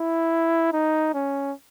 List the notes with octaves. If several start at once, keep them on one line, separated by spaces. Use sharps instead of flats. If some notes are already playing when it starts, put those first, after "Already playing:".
Already playing: E4
D#4
C#4